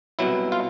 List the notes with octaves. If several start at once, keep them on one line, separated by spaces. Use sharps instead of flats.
C2 B2 F#3 E4
F4